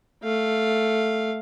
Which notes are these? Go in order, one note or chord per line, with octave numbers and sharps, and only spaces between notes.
A3 F5